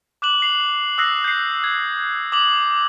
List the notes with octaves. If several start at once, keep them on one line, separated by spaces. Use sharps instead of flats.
D6 F#6 E7 F#7
C7 F7 F#7
D#6 E6 F#6 A#6 C7
G6 C7
G#6
D6 D#6 F#7